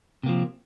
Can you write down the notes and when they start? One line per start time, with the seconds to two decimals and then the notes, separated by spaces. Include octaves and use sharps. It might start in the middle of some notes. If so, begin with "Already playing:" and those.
0.23 C3
0.26 A#3
0.29 F3